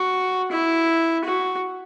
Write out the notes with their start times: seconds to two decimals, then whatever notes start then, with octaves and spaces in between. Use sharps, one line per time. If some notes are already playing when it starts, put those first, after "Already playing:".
Already playing: F#4
0.52 E4
1.24 F#4